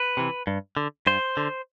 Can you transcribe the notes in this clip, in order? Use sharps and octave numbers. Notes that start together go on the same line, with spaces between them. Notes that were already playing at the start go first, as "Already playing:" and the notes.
Already playing: B4
C3 E3
G2
D3
G2 C5
D3